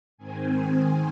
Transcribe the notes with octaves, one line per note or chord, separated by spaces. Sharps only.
G#2 D#3 C4 G#5